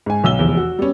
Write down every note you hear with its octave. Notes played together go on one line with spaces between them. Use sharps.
G#2 G#5
B1 E6 G7
F1 E2
F#4
G3 B3 C#4